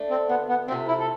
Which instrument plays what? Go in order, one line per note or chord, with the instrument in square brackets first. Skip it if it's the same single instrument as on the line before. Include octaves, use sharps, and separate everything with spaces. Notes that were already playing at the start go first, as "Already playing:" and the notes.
Already playing: [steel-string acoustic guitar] A3 D4
[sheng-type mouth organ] C4
[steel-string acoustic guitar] D2 [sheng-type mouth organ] B3
[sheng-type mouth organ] B3
[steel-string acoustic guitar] C3 F3 A3 [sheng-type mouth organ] C4
[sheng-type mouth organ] E4
A4